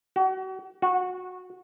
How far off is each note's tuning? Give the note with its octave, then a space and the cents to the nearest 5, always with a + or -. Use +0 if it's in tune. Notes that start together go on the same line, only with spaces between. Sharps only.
F#4 +35
F#4 -20